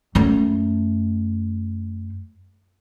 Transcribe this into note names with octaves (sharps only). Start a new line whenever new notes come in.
F#2 A3